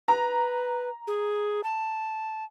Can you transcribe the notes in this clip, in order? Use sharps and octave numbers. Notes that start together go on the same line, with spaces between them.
B4 A#5
G#4
A5